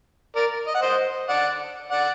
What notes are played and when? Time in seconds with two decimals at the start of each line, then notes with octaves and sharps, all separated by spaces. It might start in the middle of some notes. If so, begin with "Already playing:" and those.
0.36 A#4 D5
0.67 D#5
0.75 F#5
0.82 C5 D#5
1.29 D5 F#5
1.91 D5 F#5